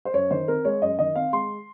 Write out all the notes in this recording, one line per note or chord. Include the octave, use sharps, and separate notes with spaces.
C5
F#2 C#5
D#3 C5
C4 A#4
G#3 C#5
F#2 D#5
D#3 D#5
C4 F5
G#3 C6